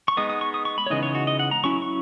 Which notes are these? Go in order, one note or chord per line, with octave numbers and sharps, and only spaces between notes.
C#6
G#3 B3 D#4 D#6
D#6
C#6
D#6
C#6
B5
C#5
C#3 E3 G#3 B3 D#4 D#5
C#5
F#4
D#5
F#5
A#5
F#3 C#4 E4 C#6
C#6